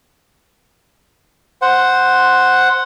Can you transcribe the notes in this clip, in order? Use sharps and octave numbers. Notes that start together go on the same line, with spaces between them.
C5 F#5